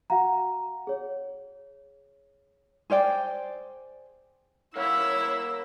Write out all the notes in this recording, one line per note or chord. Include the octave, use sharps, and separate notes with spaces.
F#4 F5 F#5 A#5
G#4 C#5
G#4 C5 D5 G5
E4 A#4 C#5 F5 F#5 E6